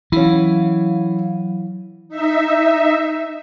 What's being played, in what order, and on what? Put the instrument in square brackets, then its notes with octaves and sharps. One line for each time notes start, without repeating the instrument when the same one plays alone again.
[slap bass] E3 [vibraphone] F#3 F5 [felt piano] C#4 E4
[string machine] D#4 E5